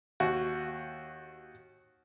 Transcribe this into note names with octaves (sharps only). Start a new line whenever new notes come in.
D#2 F#4